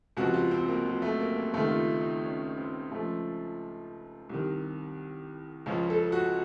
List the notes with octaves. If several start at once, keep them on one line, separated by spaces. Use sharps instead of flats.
C#2 C3 F3 F#4
F4
C4
A#3
F#3
A3
A#3
A#3
C#2 C3 D#3 A3
F4
D#4
D#4
C#4
C4
C#2 C#3 F3 A3
C2 C3 D#3
C#2 C#3 F3 C#4
A4
F#4